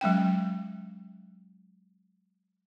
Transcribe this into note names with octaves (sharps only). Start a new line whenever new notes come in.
F#3 G#3 C#4 G5